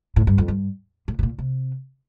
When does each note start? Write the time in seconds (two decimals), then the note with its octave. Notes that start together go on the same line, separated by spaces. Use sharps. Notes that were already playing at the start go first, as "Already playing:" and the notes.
0.16 A2
0.27 G2
0.38 F2
0.48 G2
1.08 A2
1.19 C3
1.23 A#2
1.38 C3